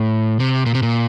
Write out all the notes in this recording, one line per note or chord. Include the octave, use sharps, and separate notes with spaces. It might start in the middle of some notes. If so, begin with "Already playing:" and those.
Already playing: A2
C3
A#2
C3
A#2